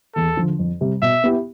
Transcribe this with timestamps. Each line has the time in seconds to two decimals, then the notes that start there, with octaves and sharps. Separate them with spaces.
0.15 E2 A4
0.37 D3 F3
0.59 F2
0.81 C3 G3
1.02 B2 E5
1.24 B3 E4 G4